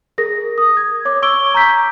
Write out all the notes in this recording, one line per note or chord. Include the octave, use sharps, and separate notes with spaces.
G#4 A#4 A#6
D#6
G#6
C#5 D6
C#6 D6 E6 G#6 D7 G7
A#5 C#6 G6 B6